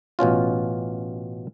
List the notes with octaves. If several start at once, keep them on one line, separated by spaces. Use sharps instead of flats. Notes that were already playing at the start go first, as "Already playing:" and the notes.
A1 B2 C#4 F4